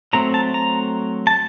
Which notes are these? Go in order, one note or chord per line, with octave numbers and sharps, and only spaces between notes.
F#3 A3 C4 A#5
A5
A#5
A5